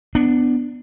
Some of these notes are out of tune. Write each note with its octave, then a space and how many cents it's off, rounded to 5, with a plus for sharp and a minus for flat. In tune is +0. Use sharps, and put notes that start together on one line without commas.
B3 +10 D4 +5